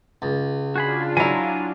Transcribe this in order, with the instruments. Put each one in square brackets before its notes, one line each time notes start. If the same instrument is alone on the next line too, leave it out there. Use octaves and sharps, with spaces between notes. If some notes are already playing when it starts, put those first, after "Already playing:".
[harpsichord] C#2
[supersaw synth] D4 F4 [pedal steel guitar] F#4 G#4 B5
[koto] F#3 E4 [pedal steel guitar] G#5 A#5